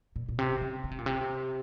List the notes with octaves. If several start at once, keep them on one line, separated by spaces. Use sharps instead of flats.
A#2
A#2
C3
C#3
C#3
C3
A#2
C3